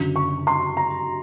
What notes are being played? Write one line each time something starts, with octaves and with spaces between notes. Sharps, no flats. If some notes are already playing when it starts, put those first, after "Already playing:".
Already playing: F#1 F#2 D3
C#6
C6
A#5